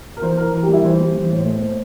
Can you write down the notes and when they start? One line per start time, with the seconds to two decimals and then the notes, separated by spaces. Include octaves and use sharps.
0.17 A#4
0.22 E3 C5
0.37 E3 A#4
0.53 E3 A#4
0.63 G4
0.68 G3
0.73 E4
0.84 E3 C5
1.00 G3
1.16 E3
1.31 A2
1.46 A3
1.62 A3